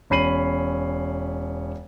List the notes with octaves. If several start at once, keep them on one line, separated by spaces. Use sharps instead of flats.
E1 C#4 B5 C7 D#7 F#7